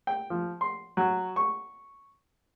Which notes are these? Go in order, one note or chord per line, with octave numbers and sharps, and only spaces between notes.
G5
F3
C6
F#3
C#6